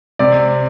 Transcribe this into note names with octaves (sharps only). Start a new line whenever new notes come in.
C3 D5